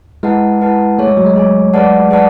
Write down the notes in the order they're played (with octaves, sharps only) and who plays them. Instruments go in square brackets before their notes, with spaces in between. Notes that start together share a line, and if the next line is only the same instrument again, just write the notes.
[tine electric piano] G#3 [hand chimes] E4 B4 F#5 A5
[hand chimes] E4 B4 F#5 A5
[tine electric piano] A3 [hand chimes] G#4 C#5 G#5
[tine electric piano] G#3
F#3
G#3
[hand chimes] G#4 C#5 G#5
G#4 B4 D5 F#5 A5
G#4 B4 D5 F#5 A5